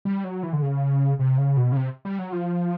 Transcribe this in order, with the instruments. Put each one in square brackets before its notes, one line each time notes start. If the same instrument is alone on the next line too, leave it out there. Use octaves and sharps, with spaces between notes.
[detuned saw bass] G3
F#3
E3
D3
C#3
C3
C#3
B2
C#3
C3
G3
F#3
F3